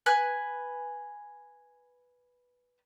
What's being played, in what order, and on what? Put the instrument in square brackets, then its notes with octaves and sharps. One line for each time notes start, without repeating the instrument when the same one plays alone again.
[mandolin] B4 G#5 F#6